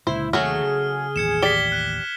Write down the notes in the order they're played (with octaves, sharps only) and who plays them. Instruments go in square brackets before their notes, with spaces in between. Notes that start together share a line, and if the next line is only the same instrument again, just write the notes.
[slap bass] C#2 A#2 D3 [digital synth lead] E4 [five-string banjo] C5
[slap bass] D#2 C3 [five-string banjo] F#3 A3 F#4 [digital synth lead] G#4 [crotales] F6
[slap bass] C#3
[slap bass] A1 D#2 [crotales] G#6 C#7 E7
[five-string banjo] G4 D5 [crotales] B6 G7
[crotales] F#6